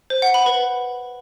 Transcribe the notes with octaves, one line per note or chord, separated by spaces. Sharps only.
C5
F#5
B5
B4